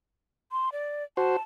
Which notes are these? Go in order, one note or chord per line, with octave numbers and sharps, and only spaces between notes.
C6
D5
F#4 C5 A5